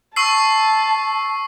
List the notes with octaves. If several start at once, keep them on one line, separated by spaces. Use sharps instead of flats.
A5 C#6 E6 C7